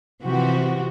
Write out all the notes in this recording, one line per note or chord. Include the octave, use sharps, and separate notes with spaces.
C3 E3 F3 F#4 G4